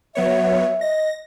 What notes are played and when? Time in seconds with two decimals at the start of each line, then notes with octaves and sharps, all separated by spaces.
0.15 F#3 B3 C#5 E5
0.81 D#5 A#6